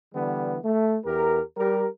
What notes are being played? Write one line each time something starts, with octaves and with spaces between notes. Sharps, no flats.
D3 E3 G3 B3
A3
E2 G4 A#4
G3 G4 A#4